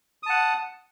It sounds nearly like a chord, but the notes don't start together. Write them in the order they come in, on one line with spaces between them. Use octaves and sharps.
D#6 A5 F#5